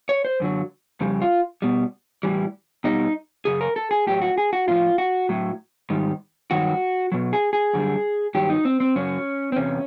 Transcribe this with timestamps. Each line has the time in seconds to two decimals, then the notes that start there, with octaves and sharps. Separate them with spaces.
0.09 C#5
0.25 C5
0.40 F#2 D3 F#3
1.01 F2 C#3 G3
1.21 F4
1.62 B2 G3
2.23 A2 E3 G3
2.84 B2 G3 D#4
3.45 F#2 C#3 G#4
3.61 A#4
3.76 A4
3.91 G#4
4.07 A2 F#3 G4
4.22 F#4
4.38 G#4
4.53 F#4
4.68 A2 F3 F4
4.98 F#4
5.29 A2 F#3
5.90 G#2 D#3 G3
6.51 G2 D#3 F#3 F#4
7.12 B2 F#3
7.33 G#4
7.53 G#4
7.73 F#2 D3 G3
8.34 G2 D#3 F#3 G4
8.50 D#4
8.65 C4
8.80 C4
8.96 F#2 C#3 F#3 C#4
9.52 C4
9.56 E2 C3 C#4